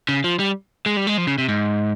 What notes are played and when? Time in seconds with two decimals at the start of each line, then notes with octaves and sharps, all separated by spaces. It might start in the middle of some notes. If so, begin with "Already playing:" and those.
0.09 C#3
0.24 F3
0.40 G3
0.86 G#3
0.97 G3
1.07 G#3
1.18 F3
1.27 C#3
1.38 C3
1.48 G#2